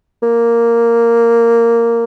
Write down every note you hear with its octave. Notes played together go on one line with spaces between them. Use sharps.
A#3